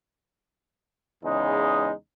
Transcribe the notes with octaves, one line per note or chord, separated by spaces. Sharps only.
E2 C#3 G#3 D#4